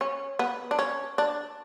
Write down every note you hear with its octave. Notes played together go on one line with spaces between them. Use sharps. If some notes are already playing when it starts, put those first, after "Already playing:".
C#4
B3
D4
C#4
D4